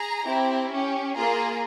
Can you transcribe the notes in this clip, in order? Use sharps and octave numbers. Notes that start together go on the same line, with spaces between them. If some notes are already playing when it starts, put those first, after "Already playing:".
Already playing: G#4 A#5
C4 E4 G4
C#4 G4
A#3 F4 G#4 A#5